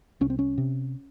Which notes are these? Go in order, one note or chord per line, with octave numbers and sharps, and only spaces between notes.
C2 C#4
C4
C#4
C3